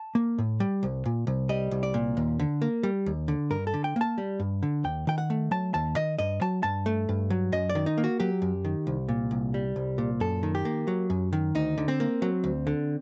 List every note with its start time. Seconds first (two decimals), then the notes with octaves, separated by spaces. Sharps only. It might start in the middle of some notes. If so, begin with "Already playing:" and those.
Already playing: A5
0.15 A#3
0.38 A2
0.60 G3
0.83 C2
1.05 A#2
1.27 C2
1.49 G3 D#5
1.71 C2
1.83 D5
1.94 A#2
2.17 D#2
2.39 D3
2.62 A#3
2.83 G3
3.06 D#2
3.28 D3
3.50 G2 A#4
3.67 A4
3.74 D3
3.84 G5
3.96 A#3 A5
4.18 G3
4.40 G2
4.63 D3
4.84 D#2 G5
5.07 D#3 G5
5.18 F#5
5.30 A3
5.51 F#3 A5
5.74 D#2 A5
5.96 D#3 D#5
6.19 G2 D#5
6.41 F#3 A5
6.63 G2 A5
6.86 A3
7.09 G2
7.30 F#3
7.52 F#2 D#5
7.69 D5
7.75 D#3
7.86 D#4
7.98 A#3
8.04 F#4
8.20 F#3 G4
8.42 F#2
8.65 D#3
8.87 C2
9.09 A#2
9.31 C2
9.54 G3
9.76 C2
9.98 A#2
10.20 F#2 A4
10.43 D#3
10.55 G4
10.65 A#3
10.88 F#3
11.10 F#2
11.33 D#3
11.55 D2 D#4
11.78 D3
11.88 C4
12.00 A#3
12.22 F#3
12.44 D2
12.67 D3